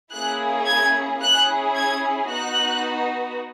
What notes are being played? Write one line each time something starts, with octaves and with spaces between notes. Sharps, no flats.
A#3 C#4 E4 G#4 F#6
G#6
C#4 E4 G#4 F#6
G#6
B3 D#4 F#4 F#6